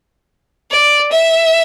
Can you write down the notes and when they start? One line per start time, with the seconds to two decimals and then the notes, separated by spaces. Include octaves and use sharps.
0.71 D5
1.12 E5